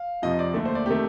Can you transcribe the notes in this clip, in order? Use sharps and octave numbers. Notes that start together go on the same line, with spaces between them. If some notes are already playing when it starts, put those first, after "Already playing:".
Already playing: F5
F2 C3 F3 D#5
D5
D#2 D3 A3
C5
D5
C3 D#3 A3 G4